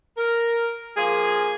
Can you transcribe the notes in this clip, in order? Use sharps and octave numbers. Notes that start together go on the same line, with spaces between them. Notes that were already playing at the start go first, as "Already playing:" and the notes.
A#4
F3 A#3 G#4